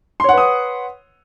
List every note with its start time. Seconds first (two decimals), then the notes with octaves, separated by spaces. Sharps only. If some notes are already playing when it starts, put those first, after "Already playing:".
0.20 C6
0.24 C#5
0.29 F#5
0.33 B4
0.38 D#6